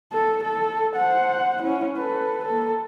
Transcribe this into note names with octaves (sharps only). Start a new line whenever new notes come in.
A4
A4
C5 F#5
C#4 E4
A4 B4
A#3 A4